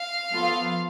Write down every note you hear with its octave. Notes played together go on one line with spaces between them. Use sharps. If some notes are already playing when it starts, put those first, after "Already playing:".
Already playing: F5
F3 B3 F4 A4